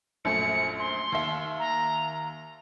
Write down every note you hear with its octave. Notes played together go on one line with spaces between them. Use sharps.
A#1 F#2 A3 C#7
C6
D#2 E5
A#5